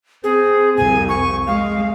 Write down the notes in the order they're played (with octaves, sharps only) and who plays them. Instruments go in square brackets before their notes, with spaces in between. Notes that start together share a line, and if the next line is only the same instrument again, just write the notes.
[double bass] C4 [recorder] G#4
[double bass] C2 F2 [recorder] G#5
[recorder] C#6
[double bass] G#3 [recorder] F5